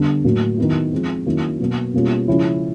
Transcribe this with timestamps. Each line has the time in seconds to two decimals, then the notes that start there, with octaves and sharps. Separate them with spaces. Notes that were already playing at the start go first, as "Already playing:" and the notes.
Already playing: D3 G3 B3
0.24 A2 F#3 A#3
0.58 D#3 F#3 B3 E4
0.92 F3 G#3 C4
1.26 D#3 F#3 A#3 C#4 E4
1.59 B2 F#3 A#3
1.93 B2 G3 A#3 C#4 F4
2.28 C#3 F3 G#3 C#4 E4